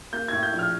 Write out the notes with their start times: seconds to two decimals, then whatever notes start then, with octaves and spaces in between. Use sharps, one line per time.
0.13 A#3 G6
0.28 A2 G#6
0.43 G6
0.53 A#1
0.59 F6